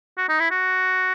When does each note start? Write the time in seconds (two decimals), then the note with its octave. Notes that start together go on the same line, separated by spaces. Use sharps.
0.18 F#4
0.29 D#4
0.40 E4
0.51 F#4